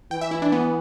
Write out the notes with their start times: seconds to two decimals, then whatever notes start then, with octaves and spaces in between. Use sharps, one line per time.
0.11 E3 G5
0.21 E5
0.31 E4
0.42 D4
0.52 B3